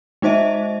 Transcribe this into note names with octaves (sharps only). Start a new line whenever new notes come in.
G#3 D#4 C5 D#5 E5